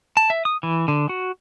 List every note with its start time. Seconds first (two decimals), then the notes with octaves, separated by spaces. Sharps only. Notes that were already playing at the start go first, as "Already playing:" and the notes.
0.17 A5
0.30 E5
0.45 D#6
0.63 E3
0.88 D3
1.09 F#4